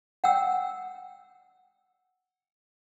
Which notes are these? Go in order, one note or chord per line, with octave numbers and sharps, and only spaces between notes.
F#5 G5 E6